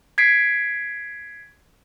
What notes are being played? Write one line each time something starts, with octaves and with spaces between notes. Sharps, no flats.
G#6 B6 C7 D7